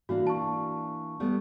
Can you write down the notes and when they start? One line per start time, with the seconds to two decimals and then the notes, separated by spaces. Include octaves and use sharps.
0.09 E3 A#3 D4 F#4
0.27 A5 C#6
1.20 G3 A3 B3